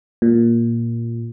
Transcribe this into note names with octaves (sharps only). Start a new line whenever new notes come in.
A#2